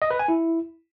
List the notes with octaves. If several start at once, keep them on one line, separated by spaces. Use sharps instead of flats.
D#5
B4
G#5
E4